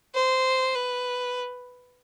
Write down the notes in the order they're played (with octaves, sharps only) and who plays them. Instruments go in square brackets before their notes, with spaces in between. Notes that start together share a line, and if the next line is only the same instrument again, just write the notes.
[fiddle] C5
B4